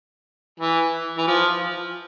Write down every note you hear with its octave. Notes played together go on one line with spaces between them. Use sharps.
E3
E3
F3